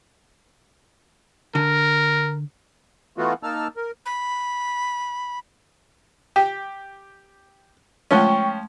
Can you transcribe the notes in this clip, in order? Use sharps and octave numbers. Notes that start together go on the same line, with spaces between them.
D3 A#4
E3 A3 B3 F4 F#4
A#3 D#4 A5 E6 F6
A#4
B5
G4 G5
F3 G#3 A3 C#4 F#5 G5 C#6